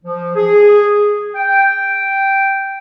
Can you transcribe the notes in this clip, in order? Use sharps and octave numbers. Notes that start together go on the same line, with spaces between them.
F3
G#4
G5